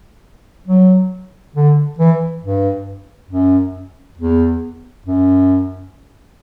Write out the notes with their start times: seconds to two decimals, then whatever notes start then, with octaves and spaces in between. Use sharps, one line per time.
0.68 F#3
1.56 D3
1.99 E3
2.43 G2
3.31 F#2
4.18 E2
5.06 F#2